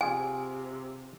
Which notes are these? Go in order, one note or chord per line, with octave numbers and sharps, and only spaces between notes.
C3 F4 G#4 G#5